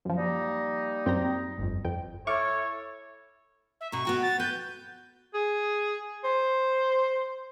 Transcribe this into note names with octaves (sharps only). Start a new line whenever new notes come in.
F#2 F3
G3 A#3 D#4
F#2 C4 G5 A#5
G1 F2
F2 G5
E4 A4 C#5 C#6 D6 F6
E5
B2 A#5 C#6
B3 F#4 G5
A6
B4 G6
G#4
C5